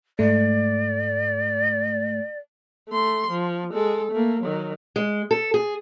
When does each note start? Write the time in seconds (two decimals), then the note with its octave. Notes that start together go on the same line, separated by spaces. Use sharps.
0.19 G#2 A3 D5
2.89 A3 C6
3.31 F3
3.73 G#3 A4
4.11 A3 A#3
4.42 D#3 F#3
4.96 G#3
5.31 A4
5.54 G#4